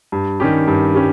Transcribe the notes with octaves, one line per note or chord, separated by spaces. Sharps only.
G2
D#3 G3 C#4 G4
G2
G3 C#4 G4